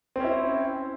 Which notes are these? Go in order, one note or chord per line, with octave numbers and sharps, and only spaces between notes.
C4 C#4 E4